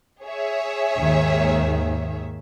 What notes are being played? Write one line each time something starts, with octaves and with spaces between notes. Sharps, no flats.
G#4 C#5 E5
D#2 G#2 D#3